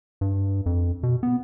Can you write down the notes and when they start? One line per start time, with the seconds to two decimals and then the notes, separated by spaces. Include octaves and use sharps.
0.21 G2
0.66 F2
1.03 B2
1.23 B3